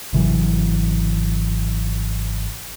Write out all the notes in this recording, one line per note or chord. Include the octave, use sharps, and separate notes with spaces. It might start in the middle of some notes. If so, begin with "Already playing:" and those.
G#1 C3 E3 F#3